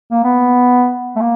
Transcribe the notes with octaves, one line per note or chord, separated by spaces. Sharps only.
A#3
B3
A3
A#3